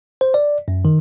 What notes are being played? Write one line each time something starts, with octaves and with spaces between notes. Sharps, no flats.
C5
D5
F#2
D#3